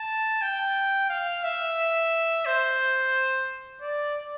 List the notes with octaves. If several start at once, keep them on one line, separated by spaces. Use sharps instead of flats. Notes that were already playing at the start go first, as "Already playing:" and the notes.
Already playing: A5
G5
F5
E5
C5
D5